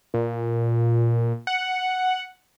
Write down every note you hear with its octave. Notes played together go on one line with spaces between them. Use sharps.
A#2
F#5